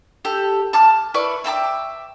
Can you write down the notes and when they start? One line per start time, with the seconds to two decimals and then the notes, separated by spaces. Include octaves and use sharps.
0.25 G4 A4
0.73 A5 D6 F6
1.14 E4 B4 D5 C#6
1.44 E5 G5 A5 D6